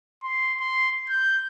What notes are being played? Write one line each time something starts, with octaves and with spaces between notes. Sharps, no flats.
C6
C6
G6